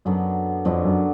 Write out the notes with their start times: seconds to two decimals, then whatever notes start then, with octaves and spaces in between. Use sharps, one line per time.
0.05 F#2 D3 F#3 B3 D4
0.65 F2 D3 F#3 B3 D4
0.84 F#2